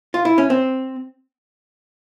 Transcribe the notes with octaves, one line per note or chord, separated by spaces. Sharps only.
F4
E4
C#4
C4